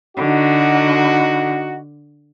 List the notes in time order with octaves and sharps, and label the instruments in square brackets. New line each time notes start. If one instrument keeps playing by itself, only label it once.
[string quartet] D3 [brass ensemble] D#4 F#4